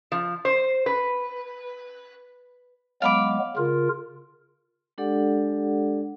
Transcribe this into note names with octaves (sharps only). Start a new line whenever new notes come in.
F3
C5
B4
F#3 G#3 B3 F5 B5 D6
C#3 F4 A#4
G#3 D4 G4 A4 D5 F#5